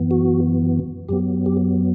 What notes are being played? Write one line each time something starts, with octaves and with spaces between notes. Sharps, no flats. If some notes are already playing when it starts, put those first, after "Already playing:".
Already playing: F#2 E3 B3
F#4
F#2 F#3 B3 G4
G4